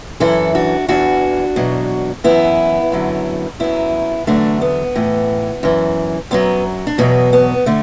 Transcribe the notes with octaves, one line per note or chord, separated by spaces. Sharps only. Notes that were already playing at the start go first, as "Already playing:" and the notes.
F#2 E3 E4 A4
D4 F#4
E2 E3 D4 F#4
E2 B2 F#3
F#2 E3 B3 E4
F#2 D3 F#3
F#2 F#3 B3 E4
E2 D3 F#3 A3 D4
B3
A2 E3
F#2 E3
F#2 D3 F#3 B3
D4
E2 B2 F#3 B3
B3
D3 A3